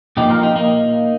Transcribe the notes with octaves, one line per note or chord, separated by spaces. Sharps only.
A#2 F3 A#3 D#4 G4
F4 A#4
D#4 G4
A#3 D#4